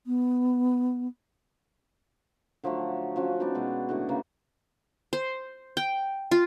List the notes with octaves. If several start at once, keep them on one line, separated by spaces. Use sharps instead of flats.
B3
D3 F3 F#3 A3
F3 C#4 F#4
B3 D#4 F#4 D5
B2 G#3 D4
A2 D3 F#4
C#3 E3 A3 A#3
C5
G5
F4